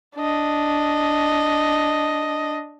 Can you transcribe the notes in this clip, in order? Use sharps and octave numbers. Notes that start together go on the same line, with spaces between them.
D4 D#5